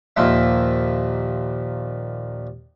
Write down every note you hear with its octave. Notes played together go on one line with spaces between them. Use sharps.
D#2 A#2 F3 C5 E5